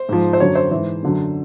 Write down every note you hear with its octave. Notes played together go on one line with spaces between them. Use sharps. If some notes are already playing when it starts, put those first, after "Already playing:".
Already playing: C5
G#2 F3
C5
F#2 D3 F#3 C#5
C5
G#2 E3 C5
F#2 D3 F#3